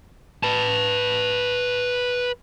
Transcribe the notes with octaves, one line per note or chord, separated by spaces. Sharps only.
B4 A5